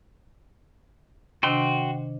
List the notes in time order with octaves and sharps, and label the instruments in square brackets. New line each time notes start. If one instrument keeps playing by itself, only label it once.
[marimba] C3 D#3 D4 [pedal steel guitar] F#4 G5 C6